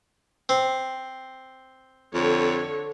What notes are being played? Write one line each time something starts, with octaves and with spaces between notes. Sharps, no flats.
C4
F2 D3 C#5